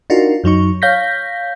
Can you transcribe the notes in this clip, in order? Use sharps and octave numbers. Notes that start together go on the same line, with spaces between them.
D4 D#4 F4 F#4 A#4
F#2 F#3 D#4 C#6
C#5 F5 G6 A#6 B6